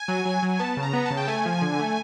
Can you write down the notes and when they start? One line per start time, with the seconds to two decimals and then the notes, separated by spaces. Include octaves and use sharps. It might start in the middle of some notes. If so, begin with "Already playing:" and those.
Already playing: G#5
0.08 F#3
0.25 F#3
0.42 F#3
0.48 G#5
0.59 B3 A5
0.77 C#3
0.83 A#5
0.93 B3
1.06 C#3 A5
1.17 G5
1.28 A3 G#5
1.45 F3
1.62 D3
1.79 A3